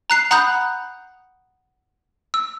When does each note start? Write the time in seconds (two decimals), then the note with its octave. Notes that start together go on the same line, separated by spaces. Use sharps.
0.10 A#5 F#6 C7
0.31 F#5 A#5 B5 D#6 F#6 G6
2.34 E6